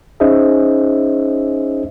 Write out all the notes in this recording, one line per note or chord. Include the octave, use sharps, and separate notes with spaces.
C#4 D#4 G#4 C5 D#5 E5